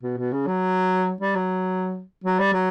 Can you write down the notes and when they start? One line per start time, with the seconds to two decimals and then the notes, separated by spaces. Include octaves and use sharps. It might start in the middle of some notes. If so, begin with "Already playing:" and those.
0.03 B2
0.18 B2
0.32 C#3
0.47 F#3
1.21 G3
1.36 F#3
2.24 F#3
2.39 G3
2.53 F#3